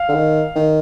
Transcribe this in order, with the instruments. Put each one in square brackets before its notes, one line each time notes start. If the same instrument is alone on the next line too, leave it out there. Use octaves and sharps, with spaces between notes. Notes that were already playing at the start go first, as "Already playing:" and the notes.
Already playing: [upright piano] F5
[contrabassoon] D3
D#3
D#3